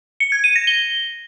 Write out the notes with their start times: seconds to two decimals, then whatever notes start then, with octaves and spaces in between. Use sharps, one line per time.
0.20 C#7
0.32 G#6
0.44 D#7
0.56 A#6
0.67 G7